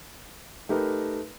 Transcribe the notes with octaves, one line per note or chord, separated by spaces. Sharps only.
A3 D#4 G4 A#4 B4